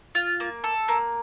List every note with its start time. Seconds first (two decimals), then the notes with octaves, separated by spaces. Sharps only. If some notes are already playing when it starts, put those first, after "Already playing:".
0.15 F4
0.40 A#3
0.64 A4
0.88 A#3